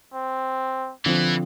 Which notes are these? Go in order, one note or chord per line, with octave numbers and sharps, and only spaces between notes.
C4
D3 E3 F3 C4